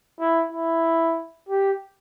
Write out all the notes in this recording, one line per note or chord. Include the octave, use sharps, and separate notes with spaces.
E4
E4
G4